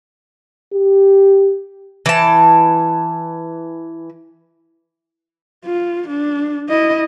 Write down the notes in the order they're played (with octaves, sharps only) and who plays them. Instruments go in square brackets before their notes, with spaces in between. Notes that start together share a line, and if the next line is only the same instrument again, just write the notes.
[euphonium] G4
[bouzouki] E3 A5
[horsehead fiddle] F4
D4
E4 D#5